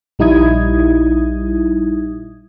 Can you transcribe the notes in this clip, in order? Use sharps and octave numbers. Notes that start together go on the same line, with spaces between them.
A#1 G3 D#4 E4 D#6 G#6